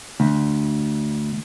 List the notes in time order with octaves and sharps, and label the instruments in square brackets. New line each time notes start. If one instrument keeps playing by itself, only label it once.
[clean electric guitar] D2